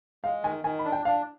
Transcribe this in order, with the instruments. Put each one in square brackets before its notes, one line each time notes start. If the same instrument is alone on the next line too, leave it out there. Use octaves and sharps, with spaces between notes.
[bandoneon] G#3 [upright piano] F5
[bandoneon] D#3 [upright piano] G#5
[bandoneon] D#3 [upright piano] G#5
[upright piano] B5
[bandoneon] D4
[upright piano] G5
[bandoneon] D4 [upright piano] F5